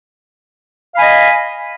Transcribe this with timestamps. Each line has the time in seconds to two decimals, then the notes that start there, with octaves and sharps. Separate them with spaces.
0.94 F5
0.96 B5
0.99 G#5
1.02 D#5